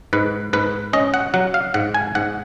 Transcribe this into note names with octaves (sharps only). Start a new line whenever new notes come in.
G#2 B4
G#2 B4
C#4 D#5
F#5
F#3 F#5
F5
G#2 F#5
G#5
G#2 F#5